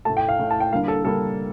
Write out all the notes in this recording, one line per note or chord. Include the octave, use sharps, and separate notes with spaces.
A2 A3 A5
G5
F5
A2 A3
A5
G5
D3 G3 A#3 F5
A4
D3 G3 A#3 A4